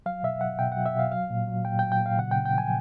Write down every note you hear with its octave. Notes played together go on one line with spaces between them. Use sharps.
F#3 F5
B2 E5
F#3 F#5
B2 G5
F#3 F#5
E5
B2 F5
F#3 F5
A#2
F#3
A#2 G5
G5
F#3
G5
A#2
F5
C#3 F#5
C#3 G5
G5
F3 G#5